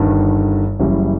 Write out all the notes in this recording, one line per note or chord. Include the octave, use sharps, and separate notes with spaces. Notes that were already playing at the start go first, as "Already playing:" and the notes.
Already playing: G1 G2 D#3
F#1 F#2 E3 G3